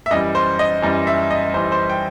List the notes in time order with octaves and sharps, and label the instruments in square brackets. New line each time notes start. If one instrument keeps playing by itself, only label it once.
[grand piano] E5
F#2 E3 G3 D#5
C5
D#5
F#2 E3 G3
E5
D#5
F#2 E3 G3 C5
C5
G5